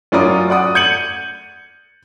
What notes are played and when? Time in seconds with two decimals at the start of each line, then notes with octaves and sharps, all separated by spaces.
0.12 F#2 C#4 F4 D5 A#5 D#6
0.50 D5 F#5 D#6
0.75 G6 G#6 C#7 D#7 F#7